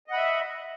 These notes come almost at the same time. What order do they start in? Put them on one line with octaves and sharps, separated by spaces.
D#5 F#5 B5 E5